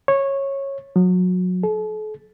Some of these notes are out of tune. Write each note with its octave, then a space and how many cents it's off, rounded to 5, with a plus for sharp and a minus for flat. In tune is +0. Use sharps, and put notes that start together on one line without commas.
C#5 -15
F#3 -25
A4 -40